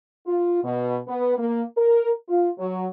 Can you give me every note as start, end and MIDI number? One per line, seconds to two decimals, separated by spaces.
0.27 0.60 65
0.63 0.98 47
1.07 1.34 59
1.37 1.62 58
1.77 2.10 70
2.29 2.48 65
2.59 2.87 54